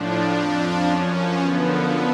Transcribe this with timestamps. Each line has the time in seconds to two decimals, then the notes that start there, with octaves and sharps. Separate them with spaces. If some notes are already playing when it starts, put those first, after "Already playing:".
Already playing: A2 F3 D4
0.32 F2 F3
0.85 F#2 F3 C#4
1.39 F#2 D3 F3 B3